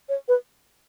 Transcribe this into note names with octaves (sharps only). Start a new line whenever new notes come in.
C#5
B4